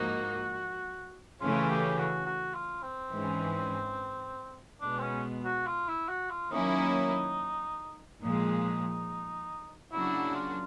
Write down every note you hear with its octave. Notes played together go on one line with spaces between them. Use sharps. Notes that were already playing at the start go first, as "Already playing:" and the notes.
Already playing: G#2 F3 A#3 D#4 F#4
C#3 E3 A3 C#4 F4
G4
F#4
F#4
F4
C4
G#2 E3 G#3 C#4
B2 G#3 B3 D4
C4
C#4
F#4
F4
E4
F#4
F4
D#3 F#3 A#3 C#4 D#4 E4
A#2 F3 G#3 D#4
C#3 F#3 A#3 D4 E4 F#4
F4